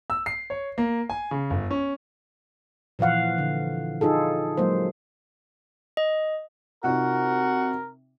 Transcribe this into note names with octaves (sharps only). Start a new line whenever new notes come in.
E6
C7
C#5
A#3
G#5
C#3
G1
C#4
A#2 E3 F3 F5 F#5
D3
D#4 F4 G#4 A4
F#3 G#3 A#3 C5
D#5
C3 D#4 F4 F#4 A#4